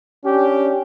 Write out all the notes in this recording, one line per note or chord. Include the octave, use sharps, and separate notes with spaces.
C#4 D4 G4